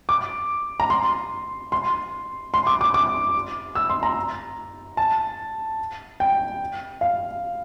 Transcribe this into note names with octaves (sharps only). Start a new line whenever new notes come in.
D6
A#5
C6
C6
C6
D6
D6
D6
E6
C6
A#5
A5
G5
F5